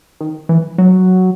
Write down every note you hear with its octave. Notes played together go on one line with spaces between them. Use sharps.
D#3
E3
F#3